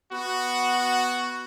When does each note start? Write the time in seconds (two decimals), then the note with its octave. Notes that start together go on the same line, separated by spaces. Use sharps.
0.12 B3 F#4